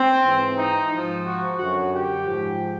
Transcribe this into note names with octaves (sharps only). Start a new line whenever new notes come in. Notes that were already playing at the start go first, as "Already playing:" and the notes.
Already playing: C4
G#2 E3
D#4
G#2 F3
F#4
F#2 D3 F#3 F#4
G4
G#2 F3